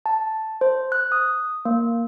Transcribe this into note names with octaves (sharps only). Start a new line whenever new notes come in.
A5
C5
F#6
D#6
A#3